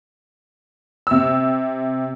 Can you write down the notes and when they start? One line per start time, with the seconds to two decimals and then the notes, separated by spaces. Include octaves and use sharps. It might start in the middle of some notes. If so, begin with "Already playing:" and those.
1.07 C3 E6